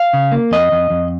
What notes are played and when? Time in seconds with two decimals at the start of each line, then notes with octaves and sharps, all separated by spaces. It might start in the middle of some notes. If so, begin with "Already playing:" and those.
Already playing: F5
0.13 C#3
0.32 A#3
0.51 F2 D#5
0.72 F2
0.90 F2